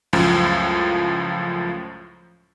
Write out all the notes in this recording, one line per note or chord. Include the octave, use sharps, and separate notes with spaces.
C#2 F#2 A2 F3